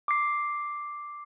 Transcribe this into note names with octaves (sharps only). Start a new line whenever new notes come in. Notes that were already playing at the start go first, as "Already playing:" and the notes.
D6 C7